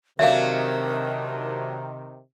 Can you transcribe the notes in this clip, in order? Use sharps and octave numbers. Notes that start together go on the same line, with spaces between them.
C3 D#3 F#3 A3 D4 A#4 E5 F5